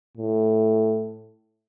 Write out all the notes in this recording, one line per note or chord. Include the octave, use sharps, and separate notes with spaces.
A2